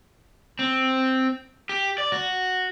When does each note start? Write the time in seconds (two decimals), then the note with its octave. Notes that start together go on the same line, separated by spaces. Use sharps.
0.59 C4
1.69 G4
1.98 D5
2.12 F#4